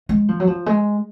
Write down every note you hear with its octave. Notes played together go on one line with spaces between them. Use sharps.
G#3
F3
F#3
F3
G#3